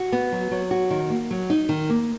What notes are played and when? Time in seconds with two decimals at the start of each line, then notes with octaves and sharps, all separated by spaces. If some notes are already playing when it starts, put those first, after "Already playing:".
Already playing: F#4
0.12 B3
0.32 F#3
0.51 F#3
0.71 F#4
0.90 D#3
1.10 A#3
1.31 F#3
1.50 D#4
1.69 D#3
1.90 A#3